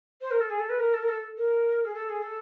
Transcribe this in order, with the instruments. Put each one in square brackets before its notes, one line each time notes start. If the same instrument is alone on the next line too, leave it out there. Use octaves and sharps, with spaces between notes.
[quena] C5
A#4
A4
G#4
A4
B4
A#4
A4
A#4
A4
A#4
G#4
A4
G#4
A4